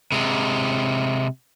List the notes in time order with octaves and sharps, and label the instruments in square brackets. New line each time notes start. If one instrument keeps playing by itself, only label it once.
[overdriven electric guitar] C3 G#3